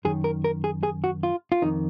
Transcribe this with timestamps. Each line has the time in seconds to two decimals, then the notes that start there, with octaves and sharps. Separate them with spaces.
0.05 F#2 D#3 G#4
0.24 A#4
0.44 A#4
0.64 G#4
0.83 G#4
1.04 F#4
1.23 F4
1.52 F4
1.62 F2 D#3 D#4